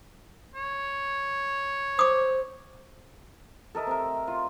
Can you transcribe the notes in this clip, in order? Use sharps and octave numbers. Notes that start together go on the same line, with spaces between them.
C#5
C5 D6 D#6
A4 A#4 D#5 E5
C3 A#4
F4